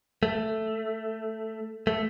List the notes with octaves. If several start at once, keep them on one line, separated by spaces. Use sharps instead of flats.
A3
A3